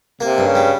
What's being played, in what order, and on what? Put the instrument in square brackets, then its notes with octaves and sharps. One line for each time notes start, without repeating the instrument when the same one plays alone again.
[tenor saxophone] C3 [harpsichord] A#3
[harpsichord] G2
[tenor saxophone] C#3
[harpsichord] G3